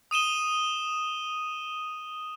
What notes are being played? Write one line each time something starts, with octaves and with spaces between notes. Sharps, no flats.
D#6 D#7 E7 G7